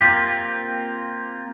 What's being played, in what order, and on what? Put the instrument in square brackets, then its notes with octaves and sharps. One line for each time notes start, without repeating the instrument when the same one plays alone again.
[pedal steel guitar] A#3 C4 F4 G4